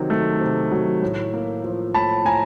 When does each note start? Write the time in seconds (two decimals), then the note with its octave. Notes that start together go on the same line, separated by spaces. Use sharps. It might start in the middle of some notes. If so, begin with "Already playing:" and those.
Already playing: C3 D#3 F#3
0.10 A3
0.40 C3
0.72 F#3
1.02 A2
1.33 A#3
1.64 F3
1.94 A2 A5 B5
2.25 A2 G#5 A#5